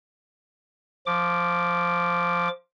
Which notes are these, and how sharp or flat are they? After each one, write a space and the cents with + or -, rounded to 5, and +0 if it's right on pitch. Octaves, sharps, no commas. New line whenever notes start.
F3 +0 D6 +0